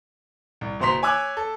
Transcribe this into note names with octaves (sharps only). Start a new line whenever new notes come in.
C2
F#1 B2 C5 A#5 C6 B6
C#5 G#5 D6 E6 F#6 G#6
A4